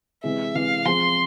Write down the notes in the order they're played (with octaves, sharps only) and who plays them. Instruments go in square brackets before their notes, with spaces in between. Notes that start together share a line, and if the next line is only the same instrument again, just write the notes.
[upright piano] C3 E3 G#3 [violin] E5
[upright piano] C3 E3 G#3 [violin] F5
[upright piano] F3 C4 F4 G#4 [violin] C6